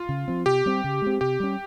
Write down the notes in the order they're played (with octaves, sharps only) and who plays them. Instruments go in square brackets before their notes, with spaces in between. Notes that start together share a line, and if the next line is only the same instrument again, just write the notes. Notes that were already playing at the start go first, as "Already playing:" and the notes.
Already playing: [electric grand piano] F4
[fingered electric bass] C#3
F3 C4
[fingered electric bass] C3 [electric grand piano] G4
[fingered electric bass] G3 C4
C#3
G#3 C4
[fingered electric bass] C3 [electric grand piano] G4
[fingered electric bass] G3 C#4